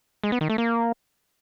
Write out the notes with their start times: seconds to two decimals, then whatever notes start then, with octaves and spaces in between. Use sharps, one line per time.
0.24 G#3
0.32 B3
0.41 D#3
0.50 A3
0.58 A#3